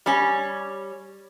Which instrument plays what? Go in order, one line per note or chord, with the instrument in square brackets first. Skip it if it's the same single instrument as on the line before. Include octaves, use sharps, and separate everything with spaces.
[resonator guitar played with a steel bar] G3 C#4